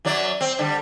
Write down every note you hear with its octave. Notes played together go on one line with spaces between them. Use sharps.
F#2 F#3 D5
C4
D3 G3